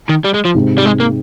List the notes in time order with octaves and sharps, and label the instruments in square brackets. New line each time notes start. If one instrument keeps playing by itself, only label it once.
[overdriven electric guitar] D#3
G3
G#3
F3
[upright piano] G#2 C3
[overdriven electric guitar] G3
G#3
A#3